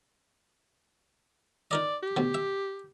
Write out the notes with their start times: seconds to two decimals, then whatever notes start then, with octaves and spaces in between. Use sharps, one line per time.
1.71 D#4 A#4 D5 D#5
2.03 G4
2.17 D2 B2
2.34 E5